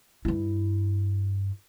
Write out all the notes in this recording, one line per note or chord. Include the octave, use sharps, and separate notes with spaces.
G2 E4